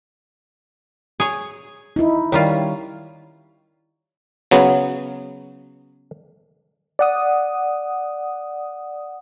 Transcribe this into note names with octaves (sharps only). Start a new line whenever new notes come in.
G#4 C#5
D#4 E4
D#3 G3 F4 C#5
C#3 F#3 B3
D5 F#5 D#6